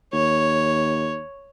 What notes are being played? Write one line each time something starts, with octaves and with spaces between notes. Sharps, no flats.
D#2 C#5